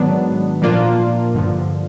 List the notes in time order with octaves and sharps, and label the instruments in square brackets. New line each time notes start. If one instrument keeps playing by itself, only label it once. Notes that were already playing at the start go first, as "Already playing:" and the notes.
Already playing: [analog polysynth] G#2 D#3 F#3 B3 D4
A#2 F3 A#3 D4 F4
G2 D3 F3